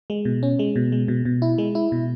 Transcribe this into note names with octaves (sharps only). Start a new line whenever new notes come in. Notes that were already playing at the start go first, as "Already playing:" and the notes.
G#3
B2
C#4
G#3
B2
G#3
B2
B2
E4
G#3
E4
B2